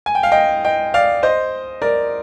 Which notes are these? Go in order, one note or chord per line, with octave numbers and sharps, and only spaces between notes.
G#5
G5
F5
D#5 G5
D#5 G5
D5 F5
C5 D#5
A#4 D5